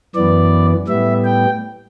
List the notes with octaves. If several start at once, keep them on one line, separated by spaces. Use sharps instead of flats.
F#2 E3 B3 D5
A2 G3 B3 E5
G5